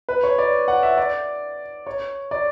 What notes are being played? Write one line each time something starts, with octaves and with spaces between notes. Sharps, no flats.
B4
C#5
D5
F#5
E5
D5
C#5
D5